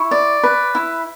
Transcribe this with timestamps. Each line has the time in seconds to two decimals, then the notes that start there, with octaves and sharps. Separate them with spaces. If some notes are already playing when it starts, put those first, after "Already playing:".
Already playing: E4 C#6
0.11 D5
0.43 B4
0.75 E4